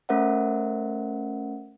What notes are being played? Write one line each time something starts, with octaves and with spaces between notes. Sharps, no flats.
A3 C#4 A#4 C5 E5 F#5